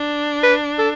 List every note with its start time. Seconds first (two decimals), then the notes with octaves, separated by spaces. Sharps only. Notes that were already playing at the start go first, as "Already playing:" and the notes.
Already playing: D4
0.43 B4
0.79 A4